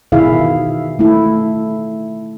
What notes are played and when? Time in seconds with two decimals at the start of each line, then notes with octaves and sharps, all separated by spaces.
0.12 B2 D#3 E4 G#4 E5 F5
0.99 A3 E4